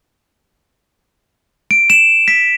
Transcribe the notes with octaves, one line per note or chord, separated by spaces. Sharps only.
D7
E7
B6